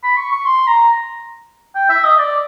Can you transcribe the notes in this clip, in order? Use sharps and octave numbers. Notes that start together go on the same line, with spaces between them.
B5
C#6
C#6
C6
A#5
G5
E5
D#5
D5